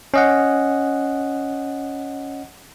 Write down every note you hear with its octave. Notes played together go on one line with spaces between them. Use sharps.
C#4 D#5 F#5